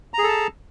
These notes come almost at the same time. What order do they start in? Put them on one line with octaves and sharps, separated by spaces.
A#5 G#4 A4 A5